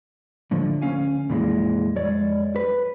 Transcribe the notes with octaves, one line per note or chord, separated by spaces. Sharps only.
A2 D3 F3
D2 C4 C#4 F5 G#5
F2 A#2 E3 G3 G#3
F2 G#3 C#5 D5
B4